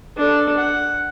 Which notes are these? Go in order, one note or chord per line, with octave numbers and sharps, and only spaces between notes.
D4 A4
F#5